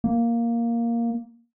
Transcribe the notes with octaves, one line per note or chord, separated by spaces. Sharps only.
A#3